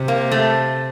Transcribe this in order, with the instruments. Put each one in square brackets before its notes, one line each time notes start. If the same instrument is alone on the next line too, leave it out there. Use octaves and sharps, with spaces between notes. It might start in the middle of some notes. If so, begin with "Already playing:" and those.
Already playing: [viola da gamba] C3
[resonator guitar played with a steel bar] A#3
A3